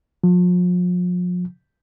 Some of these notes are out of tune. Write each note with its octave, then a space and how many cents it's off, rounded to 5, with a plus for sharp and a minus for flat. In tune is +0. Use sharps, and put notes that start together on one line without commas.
F3 +40